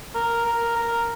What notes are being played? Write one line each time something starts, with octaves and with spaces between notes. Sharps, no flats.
A#4
A#4
A#4